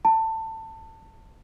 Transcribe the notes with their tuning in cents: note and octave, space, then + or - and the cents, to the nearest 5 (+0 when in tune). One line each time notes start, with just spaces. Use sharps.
A5 +20